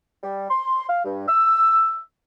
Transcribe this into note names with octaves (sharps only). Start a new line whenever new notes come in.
G3
C6
F5
G2
E6